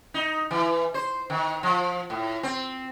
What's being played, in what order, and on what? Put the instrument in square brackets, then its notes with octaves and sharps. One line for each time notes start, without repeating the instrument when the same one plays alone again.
[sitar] D#4
E3
C5
D#3
F3
A2
C4